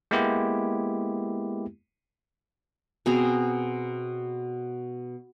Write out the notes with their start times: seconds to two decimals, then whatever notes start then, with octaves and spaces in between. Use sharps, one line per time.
0.11 G#3 A#3 B3 E4 G4
3.06 B2 C4 G#4 A#5